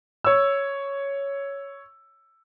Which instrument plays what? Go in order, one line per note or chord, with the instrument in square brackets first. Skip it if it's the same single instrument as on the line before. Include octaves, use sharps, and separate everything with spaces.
[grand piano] C#5 E6